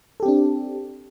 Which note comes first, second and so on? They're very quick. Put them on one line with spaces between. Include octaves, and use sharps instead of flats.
A4 G4 C4 D4